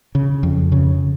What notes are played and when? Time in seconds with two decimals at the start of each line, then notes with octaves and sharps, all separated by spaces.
0.15 C#3
0.43 F2
0.72 C#3